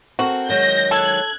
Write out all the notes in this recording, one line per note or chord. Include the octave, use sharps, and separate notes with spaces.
C4 F#4 A4 A#4
D#3 F#3 G#3 G6 A#6
A4 F#6 G#6